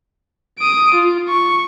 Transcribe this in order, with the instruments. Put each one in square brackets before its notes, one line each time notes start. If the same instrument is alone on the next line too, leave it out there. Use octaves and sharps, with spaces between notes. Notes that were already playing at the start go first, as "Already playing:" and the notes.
[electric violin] D#6 D7
F4
C#6